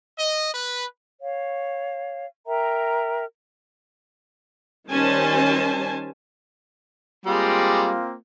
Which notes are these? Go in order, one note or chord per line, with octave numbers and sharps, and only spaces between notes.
D#5
B4
C#5 F5
A#4 E5 G5 A#5
D#3 G3 C#4 C5 G#5 A5
G3 G#3 A#3 C4 F4 G4